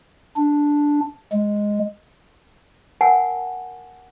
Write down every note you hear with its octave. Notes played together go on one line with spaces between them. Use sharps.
D4
G#3
A#4 F#5 G#5 A5